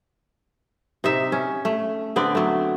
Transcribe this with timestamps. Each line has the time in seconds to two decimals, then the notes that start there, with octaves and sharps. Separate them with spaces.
1.04 C3 D#4 E5
1.32 C#4
1.65 A3
2.16 D3 B3 C4 D5
2.35 F#3 A3